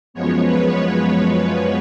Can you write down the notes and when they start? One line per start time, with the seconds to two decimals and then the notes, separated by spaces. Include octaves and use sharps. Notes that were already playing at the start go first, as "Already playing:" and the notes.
0.14 F#2 F3 G#3 B3 C#5
0.43 B4
0.73 C#5
1.34 B4